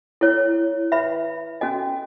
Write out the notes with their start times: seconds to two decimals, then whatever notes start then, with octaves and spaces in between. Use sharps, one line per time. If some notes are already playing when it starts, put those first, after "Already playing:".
0.21 E4 A4 C#5
0.92 B4 E5 B5
1.61 C#4 F#4 A4 D#5 G#5